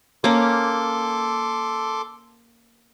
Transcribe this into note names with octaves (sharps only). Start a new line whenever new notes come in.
A#3 C#4 A4 C6 D6